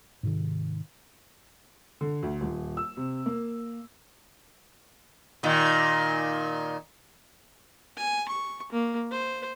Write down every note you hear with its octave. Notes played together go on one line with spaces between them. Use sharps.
G#2 C3 D#3
D3
D2
D#1
E6
C3
A#3
A#2 D#3
G#5
C#6
A#3
C5